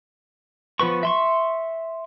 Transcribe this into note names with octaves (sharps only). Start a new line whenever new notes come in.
F3 B3 B4 C#6
E5 C6 C#6